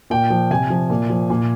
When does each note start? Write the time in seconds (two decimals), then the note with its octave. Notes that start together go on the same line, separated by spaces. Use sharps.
0.10 A#2 G5
0.30 F3
0.51 C3 G#5
0.70 F3
0.90 A#2
1.10 F3
1.30 A#2